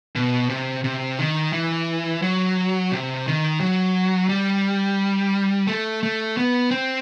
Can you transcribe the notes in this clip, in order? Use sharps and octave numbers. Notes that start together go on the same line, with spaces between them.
B2
C3
C3
D#3
E3
F#3
C3
D#3
F#3
G3
A3
A3
B3
C4